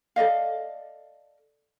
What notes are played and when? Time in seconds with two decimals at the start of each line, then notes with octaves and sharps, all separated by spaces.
0.16 A4 D5 D#5 F5